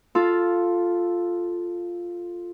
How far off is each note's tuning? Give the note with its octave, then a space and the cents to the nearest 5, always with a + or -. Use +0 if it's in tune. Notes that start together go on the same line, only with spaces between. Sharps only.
F4 +0 A4 +0